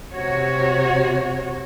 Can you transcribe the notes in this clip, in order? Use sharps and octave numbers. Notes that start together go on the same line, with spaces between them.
C3 F#4 C#5